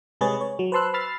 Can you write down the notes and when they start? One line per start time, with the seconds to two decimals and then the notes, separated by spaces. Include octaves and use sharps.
0.21 C3 G#3 G#4 B4 C#5 A6
0.41 C#5
0.59 F#3
0.72 B4 C5 A5 C6 E6 F#6
0.94 B5 E6 F6 A6 C7